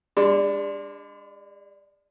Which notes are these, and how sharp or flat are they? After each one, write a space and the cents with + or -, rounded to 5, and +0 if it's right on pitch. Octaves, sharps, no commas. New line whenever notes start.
G#3 -40 D4 +0 C6 +0